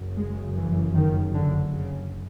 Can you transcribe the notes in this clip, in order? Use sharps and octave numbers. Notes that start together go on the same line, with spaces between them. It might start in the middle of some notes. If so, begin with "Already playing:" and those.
Already playing: F#1 F#2 C#3
G#3
E3
D#3
D3
C#3